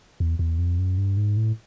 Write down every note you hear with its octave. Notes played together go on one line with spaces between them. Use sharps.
E2
E2
F2
F#2
G2
G#2
A2